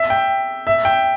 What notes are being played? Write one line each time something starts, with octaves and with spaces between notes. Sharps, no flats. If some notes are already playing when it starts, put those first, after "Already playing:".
Already playing: E5
G5
E5
G5